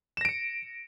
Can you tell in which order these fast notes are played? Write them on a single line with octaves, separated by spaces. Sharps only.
E7 A#6 D7 C#7